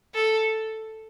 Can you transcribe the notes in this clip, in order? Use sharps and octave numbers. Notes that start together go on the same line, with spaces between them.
A4